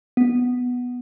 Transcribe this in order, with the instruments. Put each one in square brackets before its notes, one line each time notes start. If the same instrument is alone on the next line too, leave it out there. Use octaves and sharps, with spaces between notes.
[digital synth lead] B3